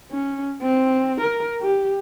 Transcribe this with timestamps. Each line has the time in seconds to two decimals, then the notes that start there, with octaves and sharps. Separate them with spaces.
0.12 C#4
0.62 C4
1.21 A#4
1.62 G4